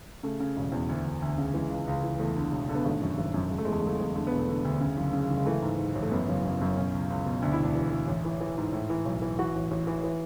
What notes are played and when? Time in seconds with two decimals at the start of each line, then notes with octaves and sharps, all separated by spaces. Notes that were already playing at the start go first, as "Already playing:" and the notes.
0.23 C#3 A3
0.40 C#3
0.56 E1
0.72 E2
0.89 D2
1.06 D2
1.22 D2
1.38 C#3
1.54 E3 G#3
1.70 C#2
1.87 C#2
2.03 E3
2.19 E2 A3
2.36 D3
2.52 E1
2.69 D3
2.75 B3
2.85 G#1 A3
3.01 F#2
3.18 G#1
3.34 F#2
3.50 C#3 G#3
3.58 A3
3.65 E2 G#3
3.72 A3
3.80 G#3
3.84 F#1 A3
3.95 G#3
4.00 E2
4.15 D3 A3
4.27 E1 B3
4.39 A3
4.49 D3
4.65 D2
4.81 C#3
4.97 F#1
5.13 C#3
5.30 F#1
5.37 G#3
5.46 E3 A3
5.62 G#2
5.78 G#2
5.95 A1
6.02 A3
6.11 F#2 B3
6.28 F#1
6.45 F#2
6.61 F#2
6.77 B2 C#4
6.93 C#2
7.10 C#2
7.26 B2
7.42 D2 D4
7.53 E4
7.59 E1 D4
7.75 E3
7.91 E3
8.07 A1
8.25 E3
8.40 E3
8.57 G#2
8.73 A2
8.90 E3
9.05 B1
9.22 E3
9.39 E3 F#4
9.55 A1
9.71 A1
9.87 E3
10.03 E3